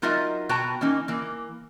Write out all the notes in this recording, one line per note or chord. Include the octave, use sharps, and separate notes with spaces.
F#3 D#4 F4 A#4 D#5 E5
B2 F#4 B4 G5 A5 A#5
E3 A#3 C#4 D#4
E3 A#3